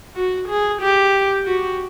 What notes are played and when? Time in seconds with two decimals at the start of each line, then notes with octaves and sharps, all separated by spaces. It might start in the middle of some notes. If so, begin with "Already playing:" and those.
0.16 F#4
0.48 G#4
0.81 G4
1.45 F#4